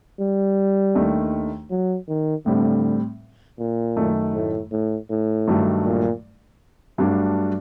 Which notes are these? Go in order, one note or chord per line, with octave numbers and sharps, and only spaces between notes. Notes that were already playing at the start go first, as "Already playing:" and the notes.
G3
D#2 D#3 A3 D4
F#3
D#3
A2 D3 G3 C4
A#2
F#2 D#3 A3
A2
A2
A2
G2 D#3 F#3 A3
A#2
G2 F#3 A3 D4 F#4